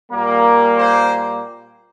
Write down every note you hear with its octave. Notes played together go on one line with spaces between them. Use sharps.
A#2 G3 A#3
C5